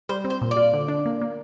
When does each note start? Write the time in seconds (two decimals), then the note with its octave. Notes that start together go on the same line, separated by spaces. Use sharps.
0.09 G3 C5
0.25 C4
0.30 C5
0.41 A#2
0.51 D5
0.57 F4
0.73 D3
0.88 D4
1.06 A#3
1.22 A#3